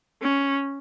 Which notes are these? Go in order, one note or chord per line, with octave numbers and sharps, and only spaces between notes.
C#4